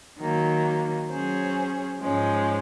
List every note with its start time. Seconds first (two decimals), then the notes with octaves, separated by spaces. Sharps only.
0.18 D#3 F#3 A#3
1.10 F#3 C#4 G#4 C5
2.02 G#2 F3 G#3 C#4